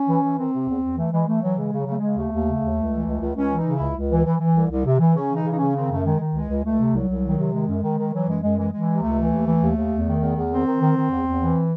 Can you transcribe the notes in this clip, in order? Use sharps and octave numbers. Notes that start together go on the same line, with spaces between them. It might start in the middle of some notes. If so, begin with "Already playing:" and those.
Already playing: C#4
E3
E3
D#3 C4
C3
E2
E2
E3 A3
E3 G#3
E3 A3
E3 F#3
C#3 G#3
C#3
F#3
C#3 A3
C#3 G#3
D#2 A3
D#2
C#3
D#2
C#2
E3
C#2
C#2
C#2 C#4
E3
D#4
C#3
E4
C#2
C#2
E3
E3
E3
C2
C2
C3
E3
C#3 C#4
E3 D#4
C#3
D#4
C#4
C#3
D#3 C4
F#2 A3
D#3 G#3
D#3
C#2 G#3
C#2
C#2 A3
C3
C2 F#3
C2
D#3
C3
D#3 G#3
F#2
D#3
D#3
E3 F#3
F#2 G#3
F#2 G#3
E3 G#3
E3 G#3
C3
C#2 A3
E3
D#2
E3
D#2
D#2
E2
D#3
E2
E2
D#3 C4
D#3
D#3
D#3
E2
E2
E3